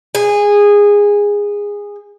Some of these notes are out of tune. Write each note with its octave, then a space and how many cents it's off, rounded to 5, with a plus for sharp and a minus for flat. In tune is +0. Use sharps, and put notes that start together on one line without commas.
G#4 -15